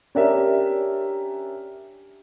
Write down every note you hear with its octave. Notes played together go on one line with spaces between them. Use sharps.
C#4 D4 G4 A#4 D5 E5